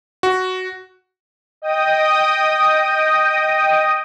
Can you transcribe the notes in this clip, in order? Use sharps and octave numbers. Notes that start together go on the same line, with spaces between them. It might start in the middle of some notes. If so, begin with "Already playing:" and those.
F#4
D#5 G5 D#6